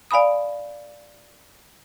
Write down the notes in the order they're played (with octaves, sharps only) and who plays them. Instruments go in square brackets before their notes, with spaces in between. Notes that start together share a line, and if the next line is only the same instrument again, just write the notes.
[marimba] D5 F5 G#5 B5 D#6